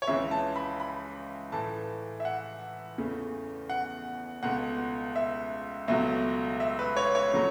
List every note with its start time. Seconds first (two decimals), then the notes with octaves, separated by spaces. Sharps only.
0.02 C#5
0.07 C#2 C#3 E3 E5
0.31 A5
0.56 B5
0.80 B5
1.52 A2 E3 A3 A5
2.20 E5
2.25 F#5
2.98 E2 C#3 A3
3.70 F#5
4.43 C#2 B2 A3 F#5
5.16 E5
5.88 C#2 B2 F#3 A3 E5
6.60 E5
6.79 B4
6.96 C#5
7.15 C#5
7.33 C#3 F#3 A3